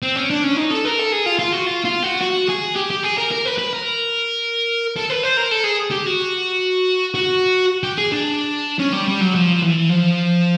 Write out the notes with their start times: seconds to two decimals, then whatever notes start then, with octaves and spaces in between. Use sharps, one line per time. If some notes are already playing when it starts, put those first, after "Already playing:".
0.02 C4
0.16 C#4
0.30 D4
0.44 C#4
0.57 D#4
0.71 A4
0.85 A#4
0.99 A4
1.12 G#4
1.26 F4
1.39 F4
1.53 F#4
1.67 F4
1.85 F4
2.03 F#4
2.21 F#4
2.49 G#4
2.76 G4
2.90 G4
3.03 G#4
3.18 A#4
3.32 A#4
3.45 B4
3.58 B4
3.73 A#4
4.96 A4
5.10 B4
5.23 C5
5.37 A#4
5.51 A4
5.64 G#4
5.91 G4
6.06 F#4
7.15 F#4
7.83 G4
7.98 G#4
8.12 D4
8.80 C#4
8.93 G3
9.08 G3
9.21 F#3
9.35 F3
9.62 E3
9.89 F3